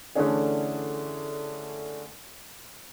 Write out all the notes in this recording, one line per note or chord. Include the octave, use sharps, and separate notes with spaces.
D3 E3 A3 C#4 D4 G#4